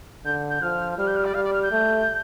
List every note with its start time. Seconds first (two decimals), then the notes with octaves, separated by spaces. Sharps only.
0.25 D3 G6
0.50 G6
0.62 F3 F6
0.98 G3 F6
1.07 G6
1.16 F6
1.25 D5
1.34 G3 F5
1.45 D5
1.53 F6
1.63 G6
1.72 A3